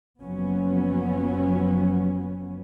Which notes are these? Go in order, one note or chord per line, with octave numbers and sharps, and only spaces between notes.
F#1 F3 F#3 B3 C#4